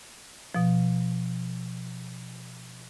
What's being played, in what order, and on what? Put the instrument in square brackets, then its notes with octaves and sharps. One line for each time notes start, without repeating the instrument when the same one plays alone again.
[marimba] B2 F3